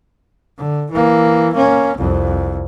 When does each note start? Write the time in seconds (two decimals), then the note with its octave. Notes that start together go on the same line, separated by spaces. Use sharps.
0.58 D3
0.91 E3 A#3
1.54 A#3 C#4
1.98 C2 F2